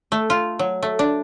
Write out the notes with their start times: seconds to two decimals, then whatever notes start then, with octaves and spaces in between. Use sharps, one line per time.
0.12 A3
0.30 F4
0.59 F#3
0.83 A3
0.99 D4